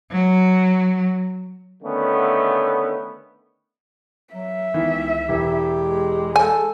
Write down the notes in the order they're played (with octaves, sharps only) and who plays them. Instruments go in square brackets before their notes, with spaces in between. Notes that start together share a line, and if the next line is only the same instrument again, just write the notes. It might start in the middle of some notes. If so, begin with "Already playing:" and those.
[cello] F#3
[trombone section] D3 D#3 A3 B3 C#4
[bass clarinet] F#3 [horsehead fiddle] E5
[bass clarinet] C#2 [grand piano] D#3 E3 B3
[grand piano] E1 E3 [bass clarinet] G4
[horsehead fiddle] G#3
[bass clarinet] A4 [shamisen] G#5